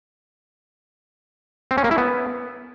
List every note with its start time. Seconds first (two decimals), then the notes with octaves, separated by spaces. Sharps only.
1.71 C4
1.78 C#4
1.84 A#3
1.91 E4
1.98 B3